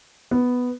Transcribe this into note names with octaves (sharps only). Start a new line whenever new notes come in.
B3